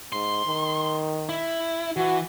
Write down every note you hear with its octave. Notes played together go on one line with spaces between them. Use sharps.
G#2 C6
D#3
E4
E3 F#4